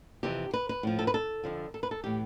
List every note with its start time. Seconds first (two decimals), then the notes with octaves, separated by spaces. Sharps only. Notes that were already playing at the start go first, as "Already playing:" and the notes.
0.23 F2 C3 E3 G4
0.53 B4
0.69 B4
0.83 A2 F3
0.99 A4
1.07 B4
1.14 A4
1.44 F2 D3 F3
1.74 A4
1.83 B4
1.91 A4
2.04 A2 E3 G4